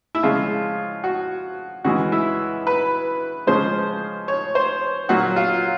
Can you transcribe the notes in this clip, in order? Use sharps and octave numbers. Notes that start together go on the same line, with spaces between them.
E4
C#3 F3 G#3 F4
F#4
C#3 E3 G#3 F#4
E4
B4
C#3 F3 G#3 C5
C#5
C5
A#2 F#3 F#4
F4